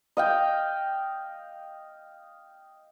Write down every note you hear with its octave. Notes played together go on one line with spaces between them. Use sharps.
D#5 F5 G5